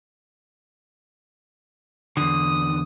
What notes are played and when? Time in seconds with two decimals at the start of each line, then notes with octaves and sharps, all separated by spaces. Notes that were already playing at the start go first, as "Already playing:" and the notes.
2.17 E2 D3 D#6